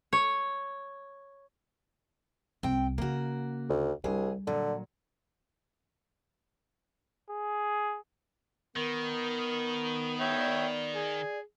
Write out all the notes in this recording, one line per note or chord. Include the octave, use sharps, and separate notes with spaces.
C#5
C2 C4 G5
C#3 A#3 F#4
D2
C2 G3 D4 G#4
A#2 D3 F#3
G#4
D#3 B3 A#4
C#5 E5 G5
D5
G#4